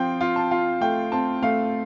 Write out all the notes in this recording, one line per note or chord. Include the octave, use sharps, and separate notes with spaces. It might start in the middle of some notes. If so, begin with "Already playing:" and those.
Already playing: F3 C4 F4 G5
F4
A5
F4
A3 G5
C4 A5
A3 F5